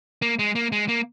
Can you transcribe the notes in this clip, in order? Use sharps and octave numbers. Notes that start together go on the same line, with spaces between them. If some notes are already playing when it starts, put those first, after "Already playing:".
A#3
G#3
A#3
G#3
A#3